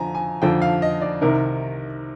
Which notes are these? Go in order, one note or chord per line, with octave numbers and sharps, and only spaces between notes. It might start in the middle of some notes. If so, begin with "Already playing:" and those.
Already playing: F2 D3 F3 G#5 A#5
G#5
F2 D3 F3 G5
F5
D#5
D5
C2 C3 D#3 A#4